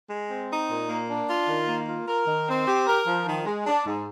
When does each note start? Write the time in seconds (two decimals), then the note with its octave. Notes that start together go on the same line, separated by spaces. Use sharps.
0.10 G#3
0.30 C4
0.49 D#4
0.69 A#2
0.89 A#3
1.09 D4
1.28 F4
1.48 D#3
1.68 A#3
1.87 F4
2.08 A#4
2.27 D#3
2.47 C4
2.67 G4
2.87 A#4
3.07 F3
3.27 D#3
3.46 G#3
3.66 D4
3.86 G#2